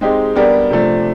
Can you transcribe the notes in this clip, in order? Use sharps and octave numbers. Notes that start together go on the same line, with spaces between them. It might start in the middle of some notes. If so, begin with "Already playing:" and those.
G#3 C4 D#4 G4
G3 B3 D4 G4 A#4
C3 F3 A3 D4